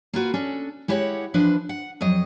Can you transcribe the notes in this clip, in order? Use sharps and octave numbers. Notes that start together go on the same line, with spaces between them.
A#3 F4 F#4 B4
C#4 D4 A4
G#3 E4 G4 C#5 D#5 F#5
E3 F3 D4 B4 C5
F#5
F2 F#3 D#5